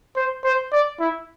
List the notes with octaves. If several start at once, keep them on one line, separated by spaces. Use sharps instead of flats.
C5
C5
D5
E4